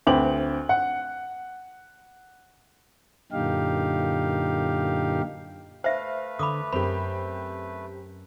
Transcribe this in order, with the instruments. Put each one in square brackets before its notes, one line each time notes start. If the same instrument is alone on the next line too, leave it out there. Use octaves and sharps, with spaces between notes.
[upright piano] D2 C4 B4 D6 F#7
F#5
[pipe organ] F#2 A#2 D3 D#4 G4 F5
[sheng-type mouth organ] A3 B4 [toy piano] C5 E5 [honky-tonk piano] F5
[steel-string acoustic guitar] D3 [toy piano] B5 D6 D#6
[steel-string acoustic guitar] F#2 [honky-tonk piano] C4 G4 [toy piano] B5